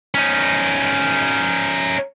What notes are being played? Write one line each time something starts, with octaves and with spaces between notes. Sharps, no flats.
C#4 D#4